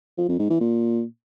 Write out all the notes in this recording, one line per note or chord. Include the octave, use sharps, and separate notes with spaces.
F3
F2
G#2
E3
A#2